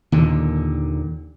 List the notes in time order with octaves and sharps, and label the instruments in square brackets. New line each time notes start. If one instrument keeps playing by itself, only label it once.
[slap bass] D#2 A#2 D3 [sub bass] D#3